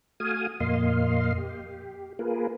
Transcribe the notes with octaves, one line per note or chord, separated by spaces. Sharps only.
A3 F#4 F5 G#5 D#6
F2 A#2 A#3 D#5 F5 C6
G4
A#3 F4 G#4 A#4 B4